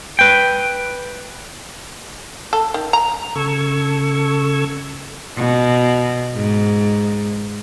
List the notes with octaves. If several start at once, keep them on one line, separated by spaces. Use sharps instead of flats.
B4 G5
A4
D#3
A#5
C#3 A4 C#6 E6 G#6
B2
G#2